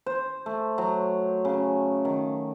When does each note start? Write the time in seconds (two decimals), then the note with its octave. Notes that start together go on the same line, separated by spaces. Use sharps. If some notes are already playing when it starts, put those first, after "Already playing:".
0.06 C5
0.46 A3
0.78 F#3
1.45 C#3
2.05 D#3